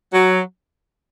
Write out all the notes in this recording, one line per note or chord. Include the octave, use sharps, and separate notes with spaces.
F#3